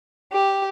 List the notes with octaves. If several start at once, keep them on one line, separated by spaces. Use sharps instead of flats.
G4